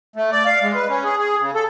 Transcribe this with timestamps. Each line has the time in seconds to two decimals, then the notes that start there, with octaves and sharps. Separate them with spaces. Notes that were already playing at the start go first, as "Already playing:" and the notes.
0.16 A3
0.32 D5
0.46 F5
0.62 G#3
0.75 B4
0.89 C#4
1.04 G#4
1.18 G#4
1.39 C#3
1.55 A4